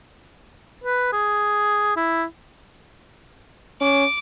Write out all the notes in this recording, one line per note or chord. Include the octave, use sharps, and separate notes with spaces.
B4
G#4
E4
C#4 D6